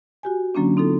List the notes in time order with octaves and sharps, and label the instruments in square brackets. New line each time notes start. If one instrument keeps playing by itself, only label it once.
[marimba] F#4 G4 G#5
D3 F#3 A#3 C#4 D4
C4 D#4 F4 A4